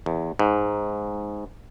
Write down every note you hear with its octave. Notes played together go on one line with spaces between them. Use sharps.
E2
G#2